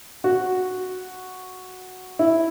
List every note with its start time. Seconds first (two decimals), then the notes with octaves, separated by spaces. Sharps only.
0.24 F#4
2.19 E4